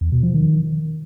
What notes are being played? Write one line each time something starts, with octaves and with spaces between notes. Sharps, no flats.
E2
B2
F3
D#3